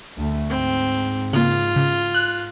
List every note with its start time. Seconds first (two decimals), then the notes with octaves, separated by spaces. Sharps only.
0.18 D2 A3
0.50 G#2 C4
1.33 C#3 A#3 F4
1.76 C#3
2.14 F#6